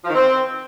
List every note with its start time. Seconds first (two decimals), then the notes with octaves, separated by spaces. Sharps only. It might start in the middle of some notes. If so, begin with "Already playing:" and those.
0.04 F3
0.10 D#3
0.15 C4